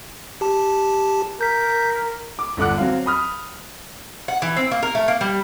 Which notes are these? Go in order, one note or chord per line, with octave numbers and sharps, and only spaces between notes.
G4 A5
A#4 G6 B6
D6
G1 D3 F#5 D6 F#6
F#3 C4 F5
B5 D#6 F6
F#5
E3
C4
A#3
A#4
A3
A#3
G3